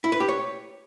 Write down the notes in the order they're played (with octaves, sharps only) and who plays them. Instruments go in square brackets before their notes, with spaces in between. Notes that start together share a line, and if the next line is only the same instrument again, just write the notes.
[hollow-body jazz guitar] E4
B4
G4
C#5